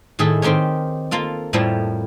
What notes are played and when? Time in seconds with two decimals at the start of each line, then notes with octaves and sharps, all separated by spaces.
0.19 A2 D#3 G#4 A4 E5
0.42 D#3 C4 G4 A#4 C#5
1.11 A#3 F4 A4
1.53 F2 A2 F3 G3 A#3 E4